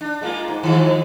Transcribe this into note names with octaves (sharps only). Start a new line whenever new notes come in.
D4
G#3 A#3 F4
G#2
D#3 F3 G#3